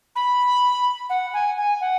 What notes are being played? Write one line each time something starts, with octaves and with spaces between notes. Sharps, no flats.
B5
F#5
G#5
G#5
F#5